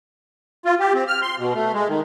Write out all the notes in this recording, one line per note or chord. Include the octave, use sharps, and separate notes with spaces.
F4
G4
C4
F6
C6
B2
A3
G#3
D#3